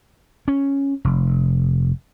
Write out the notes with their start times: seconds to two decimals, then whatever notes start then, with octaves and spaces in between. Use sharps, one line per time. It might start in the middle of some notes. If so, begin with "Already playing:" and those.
0.48 C#4
1.05 F1